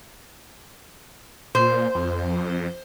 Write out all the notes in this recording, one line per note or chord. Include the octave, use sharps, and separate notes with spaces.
A#2 C5
F2